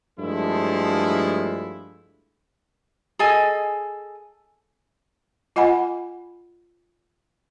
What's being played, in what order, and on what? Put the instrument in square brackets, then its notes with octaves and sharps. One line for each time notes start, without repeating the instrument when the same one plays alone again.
[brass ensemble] G2 F3 G#3 A3 E4
[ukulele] G#4 A4 D#5 G#5
[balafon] F4 D#5 F#5 G#5 B5